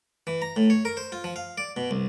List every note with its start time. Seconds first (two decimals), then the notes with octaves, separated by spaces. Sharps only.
0.27 E3
0.42 A#5
0.56 A2
0.70 C#5
0.85 A#4
0.97 C5
1.12 F4
1.24 F3
1.36 F5
1.58 D5
1.77 B2
1.91 C2